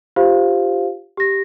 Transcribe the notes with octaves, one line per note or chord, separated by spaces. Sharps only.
F4 G4 C5 F5
G4 A#6